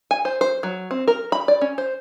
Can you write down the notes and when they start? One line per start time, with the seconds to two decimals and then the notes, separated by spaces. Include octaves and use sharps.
0.11 G#5
0.25 C5
0.41 C5
0.63 F#3
0.91 C4
1.08 A#4
1.32 B5
1.48 D5
1.61 C#4
1.78 C5